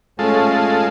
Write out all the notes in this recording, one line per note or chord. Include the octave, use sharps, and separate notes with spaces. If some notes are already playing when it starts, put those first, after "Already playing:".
G#3 A3 C#4 F4 A4